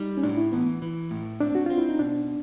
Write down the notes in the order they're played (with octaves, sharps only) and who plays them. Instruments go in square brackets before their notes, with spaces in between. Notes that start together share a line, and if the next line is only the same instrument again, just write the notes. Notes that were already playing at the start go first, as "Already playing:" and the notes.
Already playing: [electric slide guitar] G3 [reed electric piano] D#4
[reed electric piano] C#4
[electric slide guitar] A2 [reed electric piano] D4
[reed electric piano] E4
[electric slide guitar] E3 [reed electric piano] B3
[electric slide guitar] E3
A2
[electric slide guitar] C4 [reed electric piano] D4
[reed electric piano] F#4
[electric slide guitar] C4 [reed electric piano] F4
[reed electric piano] E4
D#4
[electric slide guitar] B2 [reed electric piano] D4